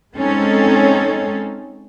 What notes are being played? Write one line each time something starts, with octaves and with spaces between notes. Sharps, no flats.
G#3 C4 C#4 D#4 A4